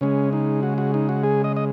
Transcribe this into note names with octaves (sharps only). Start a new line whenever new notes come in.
C#3 G#3 C#4
D#4
F#4
F#4
D#4
F#4
G#4
D#5
D#5